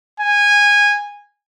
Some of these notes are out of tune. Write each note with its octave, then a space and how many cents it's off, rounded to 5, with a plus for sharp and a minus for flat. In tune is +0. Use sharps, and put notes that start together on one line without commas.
G#5 -15